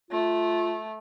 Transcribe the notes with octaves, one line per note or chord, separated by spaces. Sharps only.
A3 F4